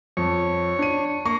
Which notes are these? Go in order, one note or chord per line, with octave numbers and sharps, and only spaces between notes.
F2 C#5
D4 D#7
A#3 C#6